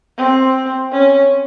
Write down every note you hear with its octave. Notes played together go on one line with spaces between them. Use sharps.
C4
C#4